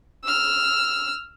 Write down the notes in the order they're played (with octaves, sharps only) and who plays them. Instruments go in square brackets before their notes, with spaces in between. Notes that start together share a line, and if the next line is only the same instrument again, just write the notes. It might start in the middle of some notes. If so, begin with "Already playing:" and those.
[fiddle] E6 F6